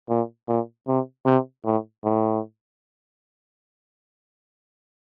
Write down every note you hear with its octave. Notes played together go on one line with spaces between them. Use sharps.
A#2
A#2
C3
C3
A2
A2